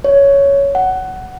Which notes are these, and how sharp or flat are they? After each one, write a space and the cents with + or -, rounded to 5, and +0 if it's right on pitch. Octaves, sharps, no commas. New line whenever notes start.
C#5 +10
F#5 +15